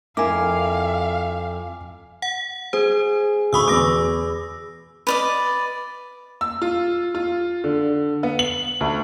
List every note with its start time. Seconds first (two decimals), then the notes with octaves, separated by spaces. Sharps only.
0.17 F2 E4 A#4 F5 G#5 D6
2.22 F#5
2.73 G#4 C5
3.53 D2 B5 C#6 D#6 E6
3.68 E2 D6 E6 A#6
5.07 B4 D5 D#5
6.41 E6
6.62 F4
7.15 F4
7.64 D3
8.23 B3
8.39 F#7
8.81 D2